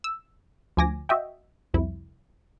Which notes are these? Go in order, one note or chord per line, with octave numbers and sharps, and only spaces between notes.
E6
D2 F3 G#5 D6 A#6
F#4 D#5 E5 G5
C2 F2 E4